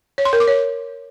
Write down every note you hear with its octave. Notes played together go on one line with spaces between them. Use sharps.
C#5
C6
A#4
D6
C#5